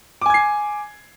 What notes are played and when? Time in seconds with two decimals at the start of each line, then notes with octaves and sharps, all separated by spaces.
0.22 D6
0.26 G#5
0.30 G#6
0.34 C7